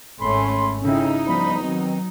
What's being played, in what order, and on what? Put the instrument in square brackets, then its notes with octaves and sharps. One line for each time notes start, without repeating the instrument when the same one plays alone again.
[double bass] G#1 [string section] A3 C#4 [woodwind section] B5 C6
[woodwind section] A2 C4 C#4 [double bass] C#3 E4 [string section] D#4
[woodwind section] D2 G3 B5 [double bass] F3 B3
[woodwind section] B2 D#3 C4 [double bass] F#3